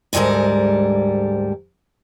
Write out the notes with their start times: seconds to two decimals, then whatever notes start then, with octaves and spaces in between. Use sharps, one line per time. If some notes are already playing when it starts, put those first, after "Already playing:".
0.13 D2 G#2 G3 G#3 A4 A#4